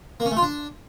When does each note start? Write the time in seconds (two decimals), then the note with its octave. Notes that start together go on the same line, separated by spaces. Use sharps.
0.20 A#3
0.26 C#4
0.31 A3
0.37 F4
0.42 D4